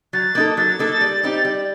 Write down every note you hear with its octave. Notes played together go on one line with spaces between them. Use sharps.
F#3 A6
A#3 D#4 A4
F#3 A6
A#3 D#4 A4
G3
C4 D#4 G4
G3